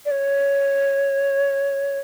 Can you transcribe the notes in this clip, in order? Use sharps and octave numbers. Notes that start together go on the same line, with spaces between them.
D5
C#5